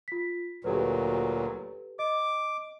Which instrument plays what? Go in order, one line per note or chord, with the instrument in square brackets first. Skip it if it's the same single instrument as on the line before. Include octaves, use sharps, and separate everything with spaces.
[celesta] F4 B6
[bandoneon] D2 A#2 F#3 [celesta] G4 A4 B4
[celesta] D#5 [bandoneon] D6